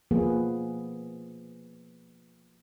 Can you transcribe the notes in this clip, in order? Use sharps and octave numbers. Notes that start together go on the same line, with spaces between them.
F3 A#3 B3 G#4